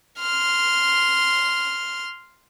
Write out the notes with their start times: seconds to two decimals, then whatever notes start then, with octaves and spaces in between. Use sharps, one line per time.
0.20 C6 F6